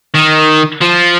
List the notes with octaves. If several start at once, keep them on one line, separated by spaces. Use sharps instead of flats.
D#3
F3